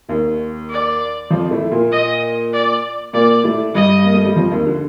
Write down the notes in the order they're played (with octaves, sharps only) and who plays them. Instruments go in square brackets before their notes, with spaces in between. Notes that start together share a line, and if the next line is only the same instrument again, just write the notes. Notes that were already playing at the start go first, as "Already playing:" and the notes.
[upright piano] D#2 D#3
[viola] D5
[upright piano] F2 F3
A2 A3
A#2 A#3
[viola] D#5
D5
[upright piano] A#2 A#3 [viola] D5
[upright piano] A2 A3
[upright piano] G2 G3 [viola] D#5
[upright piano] A#3
A3
G3
F2 F3
D#2 D#3
D3